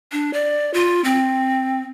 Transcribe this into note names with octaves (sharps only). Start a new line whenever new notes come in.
D4
D5
F4
C4